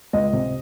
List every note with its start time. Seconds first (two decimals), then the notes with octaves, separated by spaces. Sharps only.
0.13 C#2 D#5
0.33 C3